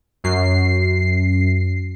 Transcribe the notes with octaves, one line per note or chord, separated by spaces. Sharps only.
F#2 C7